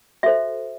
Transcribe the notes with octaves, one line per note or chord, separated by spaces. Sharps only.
F#4 A4 C5 E5